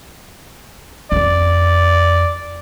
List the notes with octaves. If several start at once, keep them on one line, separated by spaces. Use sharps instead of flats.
F2 C4 D5